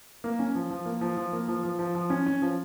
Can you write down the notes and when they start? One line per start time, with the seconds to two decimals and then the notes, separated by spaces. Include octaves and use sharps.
0.24 A#3
0.39 C#4
0.55 F3
0.71 F3
0.86 A#3
1.01 F3
1.17 F3
1.33 A#3
1.48 F3
1.63 F3
1.79 F3
1.95 F3
2.10 C#4
2.26 C#4
2.42 F3